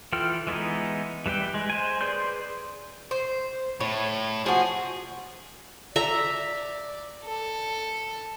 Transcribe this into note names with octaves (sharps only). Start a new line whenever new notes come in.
E3 F4 A4 G5 F6
E3 G#3 B3 D#4
E3 G3 B4 G5
G#3
C5 G#5
G#4 B4 D5 C6 G6
C5
A2 C#5
F3 F#4 G#4
D5 E5 A#5
A4